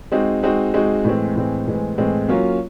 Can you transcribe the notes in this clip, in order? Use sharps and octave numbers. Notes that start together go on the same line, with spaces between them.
G#3 C4 D#4 F#4
G#3 C4 D#4 F#4
G#3 C4 D#4 F#4
A2 E3 G#3 C4
A2 E3 G#3 C4
A2 E3 G#3 C4
A2 E3 G#3 C4
F#3 A#3 C#4 F4